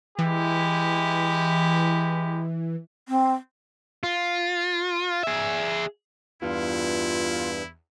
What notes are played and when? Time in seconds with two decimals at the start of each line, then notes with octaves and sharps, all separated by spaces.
0.19 E3 G#3 E4 G4
3.09 C4
4.03 F4
5.23 G#4 E5
6.42 E2 G2 E4 F4